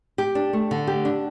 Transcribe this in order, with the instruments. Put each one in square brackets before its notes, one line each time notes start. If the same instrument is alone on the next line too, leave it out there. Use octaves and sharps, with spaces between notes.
[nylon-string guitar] G4
D4
A3
D3
G4
D4